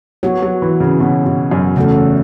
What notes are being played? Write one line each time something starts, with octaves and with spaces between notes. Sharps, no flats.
F#3 B3 F#4 C#5
F#3
E3
C#3
B2
B2
F#2
E2 C#3 A3 C#4 F#4 A4